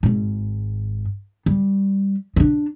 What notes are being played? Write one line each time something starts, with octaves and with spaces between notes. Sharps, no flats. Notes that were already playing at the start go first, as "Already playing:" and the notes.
G#1 G#2
G3
C#4 D4